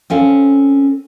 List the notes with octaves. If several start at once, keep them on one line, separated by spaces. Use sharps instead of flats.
C4 C#4 A4 F5